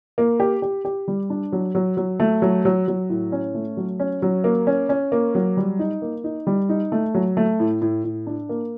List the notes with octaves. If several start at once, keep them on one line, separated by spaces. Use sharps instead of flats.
A#3
G4
G4
G4
G3
D4
F#3
F#3
F#3
A3
F#3
F#3
F#3
A2
C#4
A3
F#3
C#4
F#3
A#3
C#4
C#4
A#3
F#3
G3
D#4
A#3
D#4
G3
D#4
A3
F#3
A3
A2
A2
A2
D4
A#3